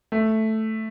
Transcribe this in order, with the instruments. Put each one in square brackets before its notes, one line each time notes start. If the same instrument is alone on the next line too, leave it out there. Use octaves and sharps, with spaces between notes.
[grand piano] A3